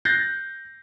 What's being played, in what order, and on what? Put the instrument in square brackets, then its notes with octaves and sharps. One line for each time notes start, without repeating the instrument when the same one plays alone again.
[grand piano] F#6 G6 A6 A#6 C7